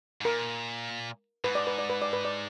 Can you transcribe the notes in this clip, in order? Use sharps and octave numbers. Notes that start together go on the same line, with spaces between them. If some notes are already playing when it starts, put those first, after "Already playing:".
G#2
A#2 A#4
G#2 B4
D5
B4
D5
B4
D5
B4
D5